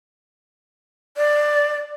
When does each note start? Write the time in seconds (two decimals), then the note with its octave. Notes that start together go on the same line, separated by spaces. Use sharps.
1.17 D5